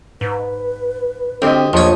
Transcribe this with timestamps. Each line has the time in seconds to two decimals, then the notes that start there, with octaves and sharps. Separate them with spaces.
0.21 G#2 B4
1.42 D2 C4 G4 C5 D#5
1.73 A#1 E2 F3 C#5 D#5 D#6